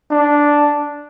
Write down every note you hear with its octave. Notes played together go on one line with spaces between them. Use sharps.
D4